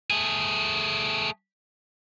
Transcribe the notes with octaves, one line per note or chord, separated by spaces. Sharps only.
A3 G#4